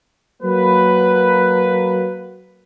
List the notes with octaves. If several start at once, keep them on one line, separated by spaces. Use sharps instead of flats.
F#3 A#3 B4